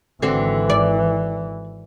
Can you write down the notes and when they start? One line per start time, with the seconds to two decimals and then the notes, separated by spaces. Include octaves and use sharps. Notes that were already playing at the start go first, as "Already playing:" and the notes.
0.22 G#1 D3 E3 C4 F#4
0.70 D5